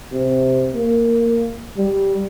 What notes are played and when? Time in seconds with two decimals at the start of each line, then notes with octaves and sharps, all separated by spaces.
0.13 C3
0.75 A#3
1.78 G3